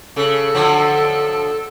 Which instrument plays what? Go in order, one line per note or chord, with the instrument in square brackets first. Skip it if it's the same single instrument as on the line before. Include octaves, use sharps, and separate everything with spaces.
[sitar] C#3 [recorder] A4
[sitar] D3 F3 F#3